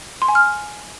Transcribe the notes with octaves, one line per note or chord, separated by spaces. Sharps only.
C6
G#5
F6